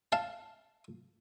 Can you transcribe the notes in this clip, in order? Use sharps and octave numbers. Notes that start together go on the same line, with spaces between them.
F5 A5